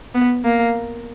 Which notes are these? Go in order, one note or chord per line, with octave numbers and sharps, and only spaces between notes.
B3
A#3